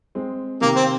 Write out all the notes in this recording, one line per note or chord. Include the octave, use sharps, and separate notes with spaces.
G#3 C4
C3 D#3 A#3
C4